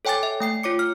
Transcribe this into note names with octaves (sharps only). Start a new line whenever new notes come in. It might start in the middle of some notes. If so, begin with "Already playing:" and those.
A4 C#5 G5 G#5 D6 A6
E5
A3 G5 C7
F4 C#5 D6 C#7
F6